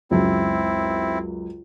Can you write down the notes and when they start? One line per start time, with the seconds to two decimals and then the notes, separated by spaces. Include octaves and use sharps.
0.11 C#2 F#2 C4 E4